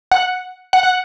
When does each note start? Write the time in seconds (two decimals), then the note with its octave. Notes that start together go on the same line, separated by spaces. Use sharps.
0.11 F#5
0.73 F#5
0.83 F#5